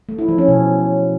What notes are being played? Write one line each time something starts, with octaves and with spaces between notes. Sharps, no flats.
A3
E4
F3
C#4
B2